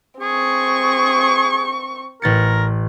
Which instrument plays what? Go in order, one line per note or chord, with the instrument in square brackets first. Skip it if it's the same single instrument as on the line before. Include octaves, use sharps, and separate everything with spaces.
[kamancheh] C4 C#6 [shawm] G#4
[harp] A1 A6 C#7 [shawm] A#4